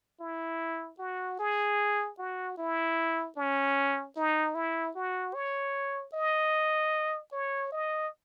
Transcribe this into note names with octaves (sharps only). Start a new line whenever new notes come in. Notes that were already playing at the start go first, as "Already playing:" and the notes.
E4
F#4
G#4
F#4
E4
C#4
D#4
E4
F#4
C#5
D#5
C#5
D#5